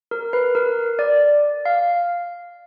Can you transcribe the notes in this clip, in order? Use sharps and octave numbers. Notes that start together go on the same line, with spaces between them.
A#4
B4
A#4
D5
F5